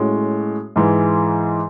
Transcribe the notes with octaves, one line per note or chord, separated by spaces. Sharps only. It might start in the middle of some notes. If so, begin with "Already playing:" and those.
Already playing: A2 G#3 C#4 F#4
G#2 E3 G#3